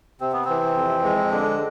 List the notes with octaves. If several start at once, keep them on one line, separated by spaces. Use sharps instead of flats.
C3 C4
B3
E3 C4
F2
G#3
D3 D4